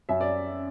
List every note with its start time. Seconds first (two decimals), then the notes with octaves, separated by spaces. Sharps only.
0.09 F#2 E5
0.21 D5